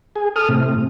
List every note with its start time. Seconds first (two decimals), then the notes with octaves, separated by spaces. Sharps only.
0.16 G#4
0.36 A4 D#6 F6
0.49 A2 C3